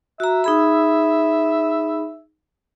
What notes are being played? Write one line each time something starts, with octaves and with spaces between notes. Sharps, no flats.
F#4 E5 A#5
D#4 G#4 B5